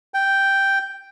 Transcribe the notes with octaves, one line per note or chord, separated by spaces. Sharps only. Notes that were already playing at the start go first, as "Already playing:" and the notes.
G5